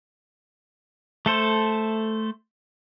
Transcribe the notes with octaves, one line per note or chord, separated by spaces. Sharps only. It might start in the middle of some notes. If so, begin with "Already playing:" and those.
A3 A4 C5